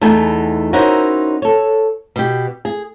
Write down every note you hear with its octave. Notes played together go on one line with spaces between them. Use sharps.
E2 A3 B3 D#4 G#5
C#4 D#4 E4 F#4 A#4 C5
A4 C#5
B2 G4
G#4